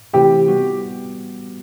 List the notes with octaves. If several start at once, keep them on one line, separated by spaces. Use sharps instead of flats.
C3 E3 A3 C4 E4 G4
G3 B3 F#4